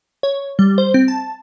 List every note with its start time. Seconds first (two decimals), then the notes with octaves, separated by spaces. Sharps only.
0.23 C#5
0.59 G3
0.78 C5
0.94 C4
1.08 A5